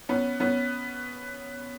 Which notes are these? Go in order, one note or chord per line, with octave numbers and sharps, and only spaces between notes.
B3 C#4
B3 C#4